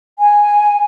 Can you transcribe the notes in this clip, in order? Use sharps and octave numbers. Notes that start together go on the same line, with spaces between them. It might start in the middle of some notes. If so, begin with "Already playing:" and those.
G#5